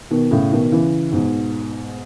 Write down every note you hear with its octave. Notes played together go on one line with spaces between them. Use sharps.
B2 D#3
A2 C#3
B2 D#3
C#3 E3
G#2 B2